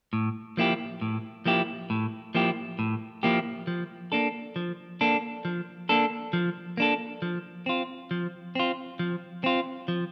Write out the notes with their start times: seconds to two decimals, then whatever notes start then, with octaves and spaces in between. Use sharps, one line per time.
0.13 A2
0.57 F3 A#3 E4 G4
1.01 A2
1.46 F3 A#3 E4 G4
1.90 A2
2.35 F3 A#3 E4 G4
2.79 A2
3.23 F3 A#3 E4 G4
3.67 F3
4.12 A#3 D4 A4
4.56 F3
5.01 A#3 D4 A4
5.45 F3
5.89 A#3 D4 A4
6.33 F3
6.77 A#3 D4 A4
7.22 F3
7.66 C4 F4
8.11 F3
8.55 C4 F4
8.99 F3
9.44 C4 F4
9.88 F3